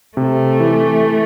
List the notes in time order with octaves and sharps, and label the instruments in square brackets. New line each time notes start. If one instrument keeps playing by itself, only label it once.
[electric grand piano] C3 [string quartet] A3
[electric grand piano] E3